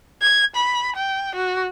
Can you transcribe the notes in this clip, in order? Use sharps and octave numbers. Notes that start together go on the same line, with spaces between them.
G#6
B5
G5
F#4